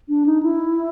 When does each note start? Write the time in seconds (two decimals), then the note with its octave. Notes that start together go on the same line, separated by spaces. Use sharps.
0.09 D4
0.26 D#4
0.42 E4